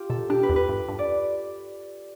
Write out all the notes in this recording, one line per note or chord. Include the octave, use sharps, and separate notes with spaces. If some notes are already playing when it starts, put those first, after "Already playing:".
Already playing: F4 G4
B2 A4
D4 G4
B4
E2
B4
G2
G2
D5